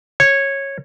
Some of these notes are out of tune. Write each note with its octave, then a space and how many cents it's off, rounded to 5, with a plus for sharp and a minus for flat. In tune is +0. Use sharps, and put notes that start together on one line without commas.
C#5 -10